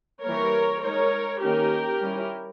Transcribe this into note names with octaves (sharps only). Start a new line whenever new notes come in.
E3 G3 A#3 A#4 C#5
G#3 D#4 A#4 C#5
D#3 A#3 C#4 G4 A#4
G3 C#4 E4